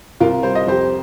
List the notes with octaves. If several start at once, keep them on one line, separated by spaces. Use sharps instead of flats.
C2 F4 A#4
G3 C5
D#5
F2 G4 C5